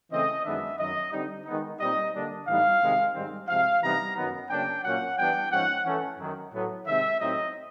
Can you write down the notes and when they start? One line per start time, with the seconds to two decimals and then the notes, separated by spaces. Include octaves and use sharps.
0.11 C#3 E3 A3 C4 D#5
0.44 F#2 D#3 G#3 B3 D4 E5
0.78 F#2 D#3 F#3 D#5
1.12 D3 G3 C4 D#4
1.46 D#3 G#3 B3 D#4
1.79 A#2 G3 C4 D#4 D#5
2.14 D3 G3 A#3 D4
2.47 A2 E3 G3 B3 D#4 F5
2.81 C3 D#3 G#3
3.14 G#2 D#3 G3 C4
3.48 C3 F3 G#3 F5
3.82 C3 E3 G3 B3 D#4 A#5
4.16 F#2 D#3 F#3 B3
4.49 C#3 F#3 A#3 D4 G5
4.83 A#2 F#3 A#3 C#4 F#5
5.17 E3 G3 B3 D4 G5
5.51 G#2 F3 G#3 C#4 F#5
5.85 E3 A3 C#4
6.19 F#2 D#3 F#3
6.53 A2 F#3 B3
6.87 C3 D#3 G#3 C4 E5
7.20 A2 F#3 A3 C4 D#4 D#5